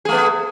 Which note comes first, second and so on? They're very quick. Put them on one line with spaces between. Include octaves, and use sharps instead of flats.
G#4 A3 B3